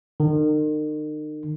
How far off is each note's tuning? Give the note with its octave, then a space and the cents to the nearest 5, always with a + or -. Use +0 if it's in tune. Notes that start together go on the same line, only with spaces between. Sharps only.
D#3 -40